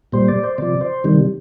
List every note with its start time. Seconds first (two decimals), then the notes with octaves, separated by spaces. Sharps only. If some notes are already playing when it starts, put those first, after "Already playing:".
0.12 A#2 G3 C5
0.28 D5
0.44 C5
0.58 C3 F3 D5
0.81 C5
1.04 C3 D#3 G3